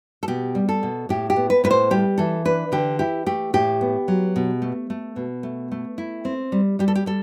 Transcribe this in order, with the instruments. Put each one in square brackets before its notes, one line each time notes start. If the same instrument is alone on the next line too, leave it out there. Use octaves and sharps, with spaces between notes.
[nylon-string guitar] A4
B2 G4
G3
A4
B2
A2 G4
G4
B3
B4
A2 B4
C5
G3 G4
E3 A4
D4 B4
D3 G4
E4 G4
A3 G4
A2 G4
B3
F#3
B2
A3
A3
B2
A3
A3
E4
C4
G3
G3 G4
A4
G4
G3 A4